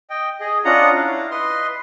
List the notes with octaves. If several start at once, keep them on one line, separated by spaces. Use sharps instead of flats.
D#5 G5
G#4 D#5
C#4 D4 F4 D#5 F#5 A#5
E4 F5
B4 D#5 C6